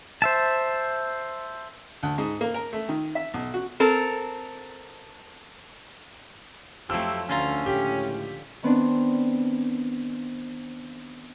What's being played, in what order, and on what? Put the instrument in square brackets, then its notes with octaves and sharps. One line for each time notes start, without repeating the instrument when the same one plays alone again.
[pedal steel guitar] C5 E5 A5
[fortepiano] D2
G#2
A#3
A#4
A3
D#3
E5
B1
F#4
[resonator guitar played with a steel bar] C4 A4 A#4
[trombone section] F2 [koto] F3 F#3 A3 [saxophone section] C4 E4 G4 [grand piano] E6
[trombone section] D2 [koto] D3 F4 A#5 [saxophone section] C#4
[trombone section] C#2 A2 [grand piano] G4
[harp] D#3 B3 C4 D4